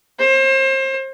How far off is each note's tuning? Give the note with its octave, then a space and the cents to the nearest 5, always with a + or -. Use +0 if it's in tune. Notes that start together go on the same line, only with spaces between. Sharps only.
C5 +35